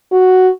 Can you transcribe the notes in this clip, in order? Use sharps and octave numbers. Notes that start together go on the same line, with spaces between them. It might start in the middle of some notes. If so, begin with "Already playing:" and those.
F#4